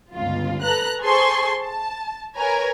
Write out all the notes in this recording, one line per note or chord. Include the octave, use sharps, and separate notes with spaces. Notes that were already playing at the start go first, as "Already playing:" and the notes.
G1 C#2 F4
A4 B4 A#5 F#6
G#4 A4 C5 C6 C#6
A5
A#4 B4 C#5 G#5 A#5